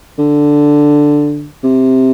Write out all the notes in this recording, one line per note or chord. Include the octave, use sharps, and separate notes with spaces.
D3
C3